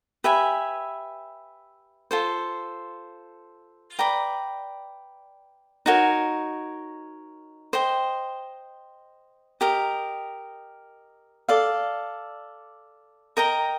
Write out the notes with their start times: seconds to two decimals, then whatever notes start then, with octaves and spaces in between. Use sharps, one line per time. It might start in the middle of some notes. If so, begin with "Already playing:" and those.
0.24 G4 B4 E5 G#5
2.11 F4 A4 C5
3.99 B4 D5 G5 A#5
5.86 D#4 F#4 A#4 C#5
7.73 C5 D#5 G5
9.61 G4 A#4 D#5
11.49 A4 D5 F5
13.37 A#4 D#5 G5 A#5